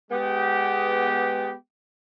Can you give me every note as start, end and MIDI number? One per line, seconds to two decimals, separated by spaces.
0.11 1.53 56
0.11 1.53 59
0.11 1.53 67